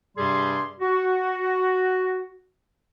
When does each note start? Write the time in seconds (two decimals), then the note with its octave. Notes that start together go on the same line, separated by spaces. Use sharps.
0.16 G2 C3 G3 G4 G#4 C6
0.80 F#4